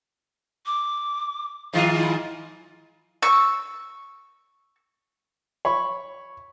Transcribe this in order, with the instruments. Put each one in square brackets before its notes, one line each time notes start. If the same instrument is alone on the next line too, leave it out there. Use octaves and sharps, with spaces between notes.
[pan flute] D6
[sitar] G#2 D#3 F4 [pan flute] F5
[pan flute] E4
[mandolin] C#6 E6
[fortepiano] C#5 B5 C#6